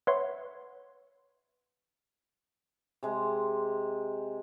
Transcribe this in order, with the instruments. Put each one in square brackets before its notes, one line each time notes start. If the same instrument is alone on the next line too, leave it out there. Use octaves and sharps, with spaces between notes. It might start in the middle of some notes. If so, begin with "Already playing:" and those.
[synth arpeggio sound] B4 C#5 E5 F#5 C6
[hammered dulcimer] C3 G#3